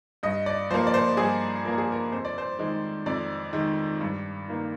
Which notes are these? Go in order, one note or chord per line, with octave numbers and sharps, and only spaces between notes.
G2 D#5
D5
F3 A#3 C5
D5
C5
G2 G#4
F3 A#3 A#4
G#4
A#4
F2 C5
D5
C5
D#3 G#3
F2 D5
D#3 G#3
G2
D#3 A#3